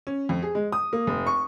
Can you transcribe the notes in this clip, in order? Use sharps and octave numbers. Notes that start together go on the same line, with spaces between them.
C#4
F2
G#4
G#3
D#6
A#3
F1
C#6